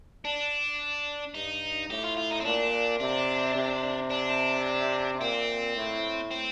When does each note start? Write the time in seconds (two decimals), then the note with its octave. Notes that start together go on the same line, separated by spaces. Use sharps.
0.25 D4
1.35 G2 D#4
1.90 A2 G4
2.04 F4
2.17 F4
2.31 D#4
2.40 C4
2.45 A#2 D4
3.00 C3 D4
3.55 C3
4.10 D4
5.21 A#2 C4
5.76 A2
6.31 C4